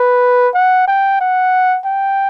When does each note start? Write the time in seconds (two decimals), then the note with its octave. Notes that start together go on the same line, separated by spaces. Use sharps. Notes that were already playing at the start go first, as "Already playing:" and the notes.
Already playing: B4
0.54 F#5
0.88 G5
1.21 F#5
1.85 G5